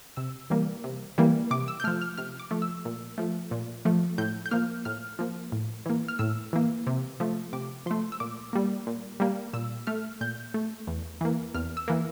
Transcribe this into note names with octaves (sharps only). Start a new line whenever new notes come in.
C3 E6
E3 G3 A#3
C3
E3 G3 A#3
C3 D6
E6
G6
F3 A3 F6
F6
C3 F6
D6
F3 A3
E6
A#2
F3 A3
A#2
F3 A3
A2 G6
G6
F3 A#3 F6
A2 F6
F3 A#3
A2
E3 A#3
F6
A2 E6
E3 A#3
C3
F3 A3
C3 D6
F3 A3 C6
E6
A#2 D6
G3 A#3
A#2
G3 A#3
A#2 E6
A3 F6
A#2 G6
A3
E2
E3 A#3
E2 F6
E6
E3 A#3